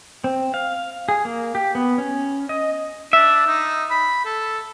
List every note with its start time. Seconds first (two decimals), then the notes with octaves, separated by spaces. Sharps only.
0.24 C4
0.54 F5
1.09 G#4
1.25 A#3
1.55 G4
1.75 B3
1.98 C#4
2.49 D#5
3.13 D4 E5
3.47 D#4
3.90 B5
4.25 A4